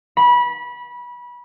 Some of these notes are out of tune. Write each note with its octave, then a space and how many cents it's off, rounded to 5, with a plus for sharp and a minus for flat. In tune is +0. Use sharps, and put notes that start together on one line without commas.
B5 -25